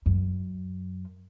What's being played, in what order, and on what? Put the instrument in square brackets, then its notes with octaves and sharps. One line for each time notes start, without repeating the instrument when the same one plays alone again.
[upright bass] F#2